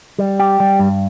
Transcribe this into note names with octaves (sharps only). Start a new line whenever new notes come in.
G3
G4
G3
G2